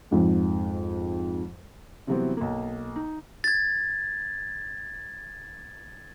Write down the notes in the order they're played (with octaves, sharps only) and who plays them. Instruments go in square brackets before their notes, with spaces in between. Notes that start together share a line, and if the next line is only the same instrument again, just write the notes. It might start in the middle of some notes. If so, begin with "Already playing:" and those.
[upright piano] F2 G#2
[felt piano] C3 E3 F#3 G3 B3 C4
B1 A#3
D#4
[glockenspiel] G#6 A6